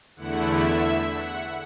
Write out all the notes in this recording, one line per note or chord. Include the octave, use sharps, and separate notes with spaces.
E2 D3 A3 E4 F#5
E5
F#5